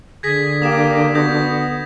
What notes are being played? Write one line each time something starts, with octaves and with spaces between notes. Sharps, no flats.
D3 G#4 G#6 A#6 B6
A#3 G4 D#6 E7
B3 F#4 D#6 G6 A#6